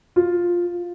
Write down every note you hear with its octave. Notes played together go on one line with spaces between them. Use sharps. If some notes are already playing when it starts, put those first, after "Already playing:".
F4